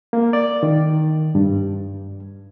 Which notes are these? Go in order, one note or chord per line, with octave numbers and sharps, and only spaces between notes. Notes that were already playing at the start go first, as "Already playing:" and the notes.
A#3
D5
D#3
G2